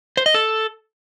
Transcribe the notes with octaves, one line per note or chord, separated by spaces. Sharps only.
C5
D#5
A4